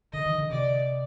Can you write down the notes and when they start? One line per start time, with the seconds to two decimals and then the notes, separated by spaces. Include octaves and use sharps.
0.13 D3 D#5
0.26 D#3
0.38 D3
0.50 C3 D5